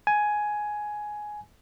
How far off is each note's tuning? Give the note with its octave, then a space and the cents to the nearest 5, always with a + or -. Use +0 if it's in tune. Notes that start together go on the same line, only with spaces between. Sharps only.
G#5 +10